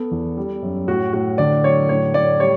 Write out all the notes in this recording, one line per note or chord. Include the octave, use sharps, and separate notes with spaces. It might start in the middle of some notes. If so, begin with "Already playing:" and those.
Already playing: B3 A4
E2
G3
F#2
A2 F#4
A2 F#4
D3 D5
F#3 C#5
A2 C#5
A2 D5
G3 C#5